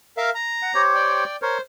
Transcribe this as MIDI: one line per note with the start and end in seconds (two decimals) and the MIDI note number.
0.17 0.30 70
0.17 0.30 76
0.17 0.30 77
0.35 0.82 82
0.62 0.72 78
0.75 1.24 67
0.75 1.24 72
0.75 1.24 73
0.95 1.36 74
0.95 1.36 79
1.42 1.58 70
1.42 1.61 72
1.42 1.58 73